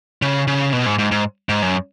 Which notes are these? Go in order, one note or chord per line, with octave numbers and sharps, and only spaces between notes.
C#3
C#3
B2
G#2
G#2
G#2
G#2
F#2